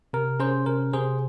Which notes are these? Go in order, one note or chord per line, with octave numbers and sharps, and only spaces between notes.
C3 A#4
C#4 G#4 C5
C3 A#4
C3 G#4 C5